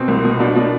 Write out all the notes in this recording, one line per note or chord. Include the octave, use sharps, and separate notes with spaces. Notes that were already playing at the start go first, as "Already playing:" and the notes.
Already playing: B2 C4
C2
B2
B2 D4
B2 D4